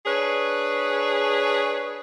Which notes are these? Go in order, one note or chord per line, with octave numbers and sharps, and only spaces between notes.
D4 G#4 B4 C#5